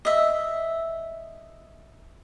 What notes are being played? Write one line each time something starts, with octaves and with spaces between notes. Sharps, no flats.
D#5 E5